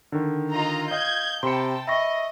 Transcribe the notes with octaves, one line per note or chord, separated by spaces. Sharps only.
D3 D#3
F4 D#5 A#5
D#5 F5 G6 G#6
C3 G5 A5 B5 C6 C#7
D#5 E5 B5 C#6 A#6